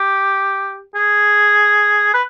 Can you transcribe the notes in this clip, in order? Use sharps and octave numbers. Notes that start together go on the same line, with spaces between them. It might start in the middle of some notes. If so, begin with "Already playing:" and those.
Already playing: G4
G#4
B4